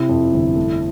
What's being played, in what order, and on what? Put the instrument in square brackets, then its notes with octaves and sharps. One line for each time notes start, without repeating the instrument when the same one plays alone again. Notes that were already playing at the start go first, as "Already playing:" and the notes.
Already playing: [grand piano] C3 [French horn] E4
[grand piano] F2
G1
A3